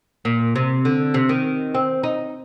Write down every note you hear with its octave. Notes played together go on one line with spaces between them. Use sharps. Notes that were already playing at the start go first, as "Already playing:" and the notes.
A#2
C3
D3
C3
D#3
C4
D#4